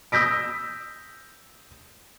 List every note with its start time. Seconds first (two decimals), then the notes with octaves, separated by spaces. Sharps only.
0.12 D#6 E6 G6 A#6 B6 D7